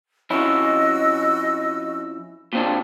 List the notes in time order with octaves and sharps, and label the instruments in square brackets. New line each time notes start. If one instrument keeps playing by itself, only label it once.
[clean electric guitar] F2 C#4 E4 [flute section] F#4 D#5 E6
[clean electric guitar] A#2 C4 D4